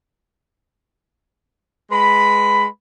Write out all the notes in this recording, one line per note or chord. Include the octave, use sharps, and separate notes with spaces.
G#3 B4 B5